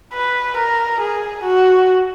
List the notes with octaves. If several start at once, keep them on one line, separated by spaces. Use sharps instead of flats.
B4
A#4
G#4
F#4